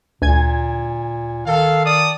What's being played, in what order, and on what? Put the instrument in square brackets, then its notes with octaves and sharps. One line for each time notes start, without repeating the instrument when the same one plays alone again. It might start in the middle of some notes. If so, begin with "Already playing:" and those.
[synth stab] D2 G#5 G#6 [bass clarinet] A#2
[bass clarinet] D#3 [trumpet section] A4 F5
[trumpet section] D5 A5 D#6